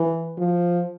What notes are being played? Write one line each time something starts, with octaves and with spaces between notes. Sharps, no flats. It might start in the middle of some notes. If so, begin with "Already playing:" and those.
Already playing: E3
F3